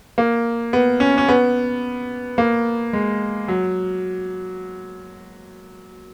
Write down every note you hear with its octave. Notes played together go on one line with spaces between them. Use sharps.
A#3
B3
C#4
C#4
B3
A#3
G#3
F#3